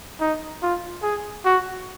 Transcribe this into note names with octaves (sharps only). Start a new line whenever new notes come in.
D#4
F4
G#4
F#4